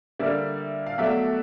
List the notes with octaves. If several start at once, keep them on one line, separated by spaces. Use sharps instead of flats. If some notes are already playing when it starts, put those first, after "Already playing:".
D3 G3 A#3 D5 E5
F5
B2 F#3 A3 D5 E5